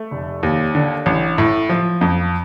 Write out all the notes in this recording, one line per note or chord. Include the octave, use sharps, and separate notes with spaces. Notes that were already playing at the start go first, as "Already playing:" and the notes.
Already playing: A3
F1
D#2
D3
A1
A2
F3
F2